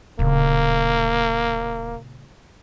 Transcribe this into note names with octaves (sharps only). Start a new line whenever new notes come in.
D1 A#2 C#3 A#3